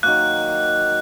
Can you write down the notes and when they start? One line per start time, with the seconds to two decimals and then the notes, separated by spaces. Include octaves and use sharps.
0.03 D#3 F#3 A#3 F#6